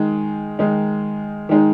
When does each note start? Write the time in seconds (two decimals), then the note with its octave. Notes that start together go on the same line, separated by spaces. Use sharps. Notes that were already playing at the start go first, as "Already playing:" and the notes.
Already playing: D#3 G#3 D#4
0.59 D#3 G#3 D#4
1.49 D#3 G#3 D#4